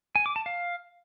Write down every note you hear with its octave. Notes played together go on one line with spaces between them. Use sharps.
G#5
D6
A5
F5